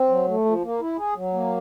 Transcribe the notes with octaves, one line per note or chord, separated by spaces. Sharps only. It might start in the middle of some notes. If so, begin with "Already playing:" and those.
Already playing: C4
F#3
A3
F3
A#3
E4
G#4
F#3
A#3